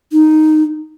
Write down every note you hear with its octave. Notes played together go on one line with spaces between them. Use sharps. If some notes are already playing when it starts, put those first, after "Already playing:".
D#4